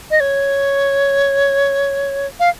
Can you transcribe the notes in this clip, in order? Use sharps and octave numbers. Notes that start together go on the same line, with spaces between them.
D#5
C#5
F5